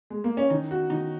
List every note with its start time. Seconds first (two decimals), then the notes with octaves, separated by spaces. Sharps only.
0.10 G#3
0.24 A#3
0.37 C#4
0.50 D#3 D#4
0.71 F#4
0.90 D#3 D#4